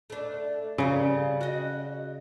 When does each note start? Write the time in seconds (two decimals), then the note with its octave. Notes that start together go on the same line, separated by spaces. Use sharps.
0.10 A3 D4
0.78 C#3 G3 A#4
1.41 F#4 D#5